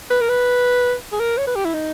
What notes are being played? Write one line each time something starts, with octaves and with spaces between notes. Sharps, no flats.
B4
A#4
B4
G#4
A#4
C#5
B4
G4
E4
D#4